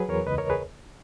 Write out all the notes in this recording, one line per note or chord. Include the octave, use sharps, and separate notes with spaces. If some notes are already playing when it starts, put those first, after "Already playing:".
Already playing: F#3 G#4 B4
E2 A#4 C#5
C#2 B4 D#5
A#4 C#5
G#4 B4